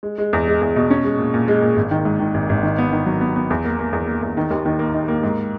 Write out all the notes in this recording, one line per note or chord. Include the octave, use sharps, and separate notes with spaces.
G#3
G#3
E2
G#3
E2
B2
C#4
G#3
A#2
A#2
G#3
A#2
G#1
D#3
G#2
D#3
G#1
G#1
D#3
B3
D#3
F#3
B3
B3
E2
A#3
A#3
E2
A#3
E2
D#3
D#2
D#3
A#3
D#4
A#3
G#2